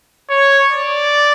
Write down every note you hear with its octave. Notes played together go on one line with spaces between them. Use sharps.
C#5
D5